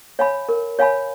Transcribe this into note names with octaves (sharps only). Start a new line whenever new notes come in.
C#5 F5 G#5 B5
A#4
C#5 F5 G#5 B5